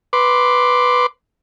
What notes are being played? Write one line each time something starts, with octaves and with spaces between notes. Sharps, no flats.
B4 C6 D6